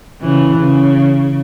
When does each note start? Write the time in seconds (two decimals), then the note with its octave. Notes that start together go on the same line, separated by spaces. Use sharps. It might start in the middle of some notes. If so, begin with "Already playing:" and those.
0.21 C#3 E3
0.59 C#3